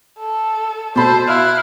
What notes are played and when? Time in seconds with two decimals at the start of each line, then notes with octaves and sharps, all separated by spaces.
0.19 A4
0.96 B2 A4 C5 A5 B5
1.27 E4 F5 F6 F#6